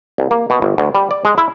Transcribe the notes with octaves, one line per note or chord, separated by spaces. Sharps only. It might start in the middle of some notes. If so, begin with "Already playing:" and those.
C2
A#3
B2
G1
D2
G3
D5
G#3
E4